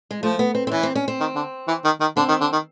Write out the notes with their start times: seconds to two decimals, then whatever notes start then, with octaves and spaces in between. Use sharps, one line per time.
0.11 G#3
0.22 F3 A3
0.39 B3
0.55 C4
0.67 C4
0.71 E3 C#4
0.83 C4
0.95 C#4
1.08 C4
1.20 D#3
1.36 D3
1.68 E3
1.85 D#3
2.00 D#3
2.17 D3 C4
2.28 D#3
2.41 D3
2.52 D#3